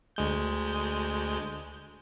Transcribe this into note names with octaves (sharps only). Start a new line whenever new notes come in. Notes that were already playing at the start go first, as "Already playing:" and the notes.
D2 G#3 G6